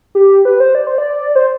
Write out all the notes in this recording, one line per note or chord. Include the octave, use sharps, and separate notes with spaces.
G4
B4
C5
D5
C5
D5
C5